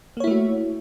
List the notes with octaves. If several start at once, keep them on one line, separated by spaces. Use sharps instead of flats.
A3 A#3 E4 F#4 C#5